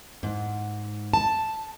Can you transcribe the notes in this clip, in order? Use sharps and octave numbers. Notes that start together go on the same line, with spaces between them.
G#2
A5